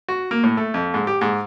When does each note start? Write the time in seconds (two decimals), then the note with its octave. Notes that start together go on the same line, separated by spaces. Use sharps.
0.09 F#4
0.31 A#3
0.43 A2
0.57 A3
0.74 F2
0.94 G#2
1.07 G4
1.21 G#2